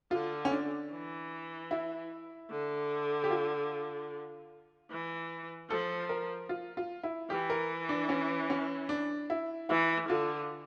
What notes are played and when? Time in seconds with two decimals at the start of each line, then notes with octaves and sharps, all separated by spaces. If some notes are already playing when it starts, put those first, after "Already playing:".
0.11 D3 F4
0.45 C#4
0.52 D4
0.91 E3
1.71 E4
2.50 D3
3.24 G4
3.30 F4
4.90 E3
5.70 F3 A4
6.09 A#4
6.49 F4
6.77 F4
7.03 E4
7.30 E3 G4
7.50 A#4
7.89 D4
8.09 C#4
8.50 C#4
8.89 D4
9.30 E4
9.69 E3 E4
10.09 D3 F4